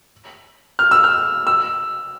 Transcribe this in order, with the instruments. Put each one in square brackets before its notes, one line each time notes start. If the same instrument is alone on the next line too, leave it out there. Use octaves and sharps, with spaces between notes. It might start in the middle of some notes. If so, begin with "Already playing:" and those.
[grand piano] F6
E6
F6
E6